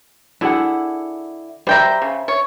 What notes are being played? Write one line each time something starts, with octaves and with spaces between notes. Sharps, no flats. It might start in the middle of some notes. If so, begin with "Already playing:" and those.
D3 E4 G#4 F#5
G3 C5 E5 G5 A#5
C#3
C#5